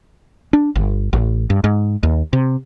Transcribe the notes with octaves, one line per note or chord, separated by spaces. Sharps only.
D4
G1
A1
G2
G#2
D#2
C3